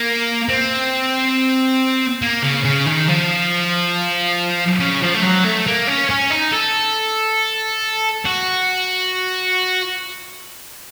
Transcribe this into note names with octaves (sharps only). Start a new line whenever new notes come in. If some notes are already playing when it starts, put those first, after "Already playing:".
Already playing: A#3
C4
A#3
C#3
C#3
D#3
F3
C#3
F3
A3
F#3
A3
A#3
C#4
C#4
D#4
A4
F#4